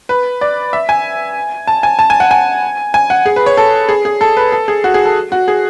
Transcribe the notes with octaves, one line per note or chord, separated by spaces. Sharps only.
B4
D5
E5
G#5
A5
G#5
A5
G#5
F#5
G#5
G#5
F#5
G#4
B4
C#5
A4
G#4
G#4
A4
B4
A4
G#4
F#4
G#4
A4
F#4
G#4